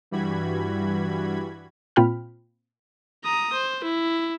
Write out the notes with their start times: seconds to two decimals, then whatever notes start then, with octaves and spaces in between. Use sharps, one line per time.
0.11 G2 E3 G3 F#4 B5 G#6
1.96 A#2 C4 F4 G5 B5 F6
3.25 A#5 D#6
3.53 C5
3.84 E4